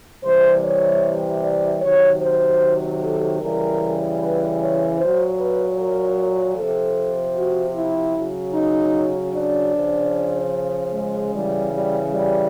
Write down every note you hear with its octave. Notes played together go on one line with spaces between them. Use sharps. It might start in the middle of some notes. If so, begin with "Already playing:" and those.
C3 E3 G3 C5
C#5
D5
C3 D#3 F#3 C#5
C5
A4
C#3 E3 G3 A#4
B4
C#5
A#2 F#3 C5
B4
A#4
C3 F3 A4
F#4
E4
C#3 F#3
D#4
D4
C#3 F3
G#3
C#3 E3 G3
G3
G3